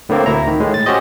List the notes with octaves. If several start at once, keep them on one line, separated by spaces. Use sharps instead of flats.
A2 D3 A#3 C4
D2 E4 A#5
D#3
A2 G#3
A6
C#4 F#4 G4 C5 D#5